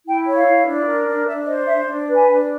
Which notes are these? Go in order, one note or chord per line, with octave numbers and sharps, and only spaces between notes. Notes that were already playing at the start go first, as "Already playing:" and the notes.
E4 G5
C#5
F5
E4
D4
A#4
D4
D4 E5
C5 D#5
D4 E5
D4
B4
G#5
D4